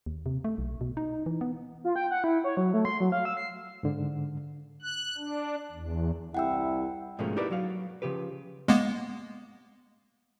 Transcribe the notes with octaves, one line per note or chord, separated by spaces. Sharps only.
D#2
C3
A3
B1
B2
D#4
E3
B3
F4
G5
F#5
E4
C#5
F#3
A3
C6
F#3
F5
E6
C7
G#2 D3
F#6
D4
E2
C2 E4 F#5 G5 E6
G#2 B2 F3 A3 A#3 C#4
D#4 E4 G4 A#4 B4 D5
F#3 F#4 F5
C#3 F3 G4 B4
G#3 A#3 B3